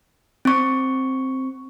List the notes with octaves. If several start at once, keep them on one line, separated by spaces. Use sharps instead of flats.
C4 C#6